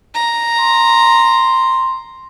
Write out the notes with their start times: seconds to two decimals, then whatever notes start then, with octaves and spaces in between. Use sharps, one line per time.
0.15 A#5
0.59 C6